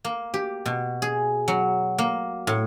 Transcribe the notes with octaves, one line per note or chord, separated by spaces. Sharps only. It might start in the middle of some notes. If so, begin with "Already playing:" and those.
A#3
G4
B2
G#4
F#3
A#3
A2